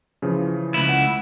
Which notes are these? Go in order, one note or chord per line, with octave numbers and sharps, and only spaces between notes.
C#3 E3 F3
C#2 E4
F#5